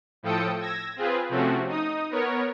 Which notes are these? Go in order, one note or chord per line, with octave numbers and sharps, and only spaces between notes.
A2 F3 A4 G5 D#6 C#7
E6 G#6 A#6
C4 F4 G#4 B4
C3 F3 A3 C4 C#4 F#4
D#4 D#6
B3 A#4 C#5